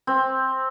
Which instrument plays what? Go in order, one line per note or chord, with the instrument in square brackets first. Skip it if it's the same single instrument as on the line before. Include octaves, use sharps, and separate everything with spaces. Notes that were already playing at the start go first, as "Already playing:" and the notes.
[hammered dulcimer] C4